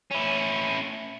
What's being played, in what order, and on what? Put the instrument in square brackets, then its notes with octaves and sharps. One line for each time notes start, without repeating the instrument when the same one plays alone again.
[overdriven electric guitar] C#4 E4